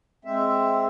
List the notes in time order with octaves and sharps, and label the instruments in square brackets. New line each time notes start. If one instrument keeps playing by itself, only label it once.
[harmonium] G#3 C4 E5